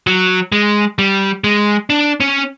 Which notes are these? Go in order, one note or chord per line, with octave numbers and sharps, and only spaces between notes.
F#3
G#3
G3
G#3
D4
C#4